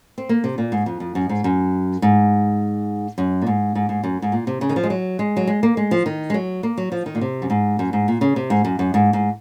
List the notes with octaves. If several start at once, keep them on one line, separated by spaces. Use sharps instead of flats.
C4
A#3
C3
A#2
G#2
F2
F2
F#2
G#2
F#2
G#2
F#2
A#2
G#2
G#2
G#2
F#2
G#2
A#2
C3
C#3
D#3
F3
G#3
F#3
G#3
F#3
G#3
A#3
G#3
F3
D#3
G#3
F#3
A#3
F#3
F3
D#3
A#2
C3
F#2
G#2
F#2
G#2
A#2
C#3
C3
G#2
F#2
F#2
G#2
G#2